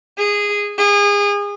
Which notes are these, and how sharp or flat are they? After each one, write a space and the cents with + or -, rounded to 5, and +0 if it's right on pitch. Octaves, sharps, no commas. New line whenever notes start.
G#4 -15
G#4 -30